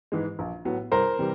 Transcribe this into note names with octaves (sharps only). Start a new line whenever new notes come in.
G#2 E3 G#3
A#1
A2 F#3 B3
C2 A#4 C5
C3 E3 G3